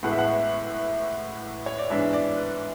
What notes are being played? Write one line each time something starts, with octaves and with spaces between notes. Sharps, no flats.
A1 A2 G#3 B3 E4 F#5
E5
F#5
C#5
D5
G#2 E3 B3 D4 E5
D5
B4